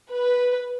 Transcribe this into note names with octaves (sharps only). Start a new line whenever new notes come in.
B4